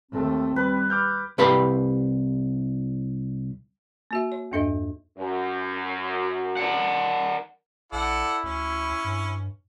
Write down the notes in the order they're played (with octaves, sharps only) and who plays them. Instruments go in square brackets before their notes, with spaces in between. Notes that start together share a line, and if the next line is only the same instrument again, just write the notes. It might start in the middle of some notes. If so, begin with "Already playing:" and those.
[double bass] D#2 A3 [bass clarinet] C4
[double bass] G3 [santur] B4
[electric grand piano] D6 F6 G6
[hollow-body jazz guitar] C2 G4 B4 F5 B5
[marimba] A#3 F#4 E5
C#5
E2 G2 D4 A4 D#5 E5
[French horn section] F#2
[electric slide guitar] A#4 D5 F#5
[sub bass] A#1 [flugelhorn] E4 [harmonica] A4 D5 F#5
[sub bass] D2 [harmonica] C#4
[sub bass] G2